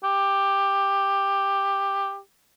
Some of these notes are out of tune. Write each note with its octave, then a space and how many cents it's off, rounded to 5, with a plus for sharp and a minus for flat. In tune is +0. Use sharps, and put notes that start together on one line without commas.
G4 +10